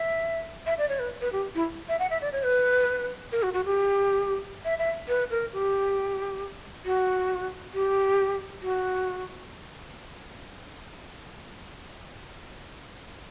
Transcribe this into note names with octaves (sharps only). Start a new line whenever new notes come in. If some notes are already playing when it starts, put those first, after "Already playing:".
Already playing: E5
E5
D5
C#5
B4
B4
G4
E4
E5
F#5
E5
D5
C#5
B4
A#4
F#4
F#4
G4
E5
E5
B4
A#4
G4
F#4
G4
F#4